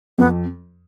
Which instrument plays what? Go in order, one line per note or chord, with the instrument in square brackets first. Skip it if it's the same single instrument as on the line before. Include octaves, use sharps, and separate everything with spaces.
[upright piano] F2 [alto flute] B3